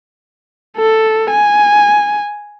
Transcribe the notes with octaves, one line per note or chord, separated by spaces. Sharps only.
A4
G#5